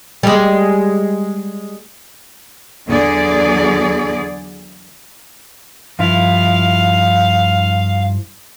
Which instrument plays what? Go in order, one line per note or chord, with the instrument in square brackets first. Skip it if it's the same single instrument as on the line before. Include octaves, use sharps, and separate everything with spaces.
[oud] G3 G#3
[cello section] E2 D3 F#3 G#4 D5
[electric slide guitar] G2 F3 E4 [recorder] F5